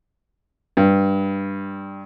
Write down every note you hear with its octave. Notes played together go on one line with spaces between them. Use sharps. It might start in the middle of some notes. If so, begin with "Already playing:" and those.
G2